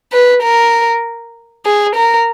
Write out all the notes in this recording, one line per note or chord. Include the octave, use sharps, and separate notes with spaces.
B4
A#4
G#4
A#4